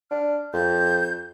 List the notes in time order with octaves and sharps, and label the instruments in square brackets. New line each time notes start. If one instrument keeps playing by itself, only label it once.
[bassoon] D4 [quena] F6
[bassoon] F2 [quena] G6